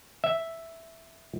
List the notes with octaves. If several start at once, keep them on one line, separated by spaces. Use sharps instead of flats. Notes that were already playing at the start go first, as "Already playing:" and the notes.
E5